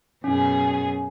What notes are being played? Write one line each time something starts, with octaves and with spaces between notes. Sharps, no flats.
F#2 B2 C#4 G#4